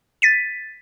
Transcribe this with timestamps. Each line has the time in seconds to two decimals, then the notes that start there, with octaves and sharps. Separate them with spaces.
0.22 A6 B6 D#7